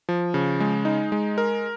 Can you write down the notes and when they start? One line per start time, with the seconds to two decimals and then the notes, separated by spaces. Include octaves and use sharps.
0.09 F3
0.34 C#3
0.60 G#3
0.85 D#4
1.12 G#3
1.38 A#4